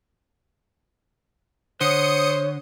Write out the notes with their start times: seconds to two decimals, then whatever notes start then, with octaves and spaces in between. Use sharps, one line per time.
1.81 D3 C5 C#5 D#6 C#7